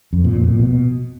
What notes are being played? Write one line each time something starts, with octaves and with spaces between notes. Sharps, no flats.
F2
A#2
F2
A#2
B2